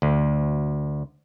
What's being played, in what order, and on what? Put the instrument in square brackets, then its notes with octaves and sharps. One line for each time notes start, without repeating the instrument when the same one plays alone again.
[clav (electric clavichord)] D2